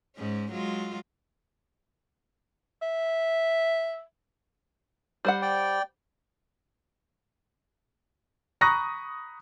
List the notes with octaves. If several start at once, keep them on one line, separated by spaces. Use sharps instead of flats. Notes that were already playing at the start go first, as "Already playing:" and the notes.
G#2 G#3 C#4
F#3 G#3 F4
E5
G3 C5 F#5
D5 G5
A#5 B5 C#6 D#6 F#6 A#6